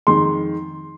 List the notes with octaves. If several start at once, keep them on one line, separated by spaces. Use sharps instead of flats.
F2 D#3 G#3 C6